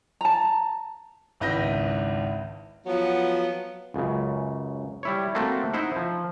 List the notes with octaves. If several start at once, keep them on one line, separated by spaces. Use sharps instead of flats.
A5 A#5
G#1 C#2 E4 B4 G6 A#6
F3 F#3 B3
C#2 F#2 C#3
G3 E4 C#5
A3 A#3 C4 F#4 A4
D#4 E4 C5 F#5
F3